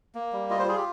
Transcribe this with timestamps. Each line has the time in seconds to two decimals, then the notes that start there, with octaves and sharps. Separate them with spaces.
0.15 A#3
0.33 G3
0.50 F4 D#5
0.59 C5
0.68 F4 G#4
0.77 G4